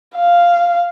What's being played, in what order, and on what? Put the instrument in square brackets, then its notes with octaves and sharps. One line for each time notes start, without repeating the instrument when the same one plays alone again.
[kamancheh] F5